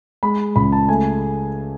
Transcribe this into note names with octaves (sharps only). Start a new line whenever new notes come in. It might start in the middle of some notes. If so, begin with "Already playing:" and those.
G#3 B5
C#2 B5
A5
A3 G#5